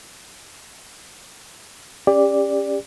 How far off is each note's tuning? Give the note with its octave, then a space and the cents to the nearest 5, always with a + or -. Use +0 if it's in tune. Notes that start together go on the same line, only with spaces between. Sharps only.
C#4 +0 G4 +35 D5 +0